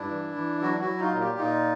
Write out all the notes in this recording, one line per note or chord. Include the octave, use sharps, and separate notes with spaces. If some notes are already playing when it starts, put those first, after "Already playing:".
Already playing: G2 D4 E4
E3
E3
F#3 E4 F#4
E4 F#4
F#3
D#4 F4
A#2
F4 G4
A#2 D#4 F4